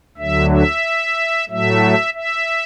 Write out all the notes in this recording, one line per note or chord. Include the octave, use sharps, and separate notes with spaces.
D2 D3 F#3 E5
E5
A2 F#3 A3 E5
E5